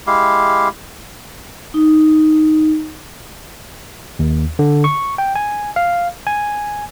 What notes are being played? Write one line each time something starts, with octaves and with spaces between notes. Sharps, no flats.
G#3 E4 G4 F5
D#4
D#2
D3
C#6
G5
G#5
F5
G#5